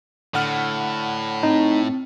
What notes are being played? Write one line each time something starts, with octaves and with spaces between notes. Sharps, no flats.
A2 D3 F#5 F6
C4 D#4